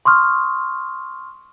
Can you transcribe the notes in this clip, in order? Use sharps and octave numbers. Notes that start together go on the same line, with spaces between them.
C6 C#6 D#6 F6